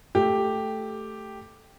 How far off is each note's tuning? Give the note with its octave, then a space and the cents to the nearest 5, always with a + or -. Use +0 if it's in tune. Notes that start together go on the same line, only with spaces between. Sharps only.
A3 +0 G4 +0